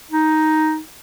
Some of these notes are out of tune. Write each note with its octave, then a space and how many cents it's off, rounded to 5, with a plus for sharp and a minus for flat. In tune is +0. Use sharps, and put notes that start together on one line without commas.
D#4 +5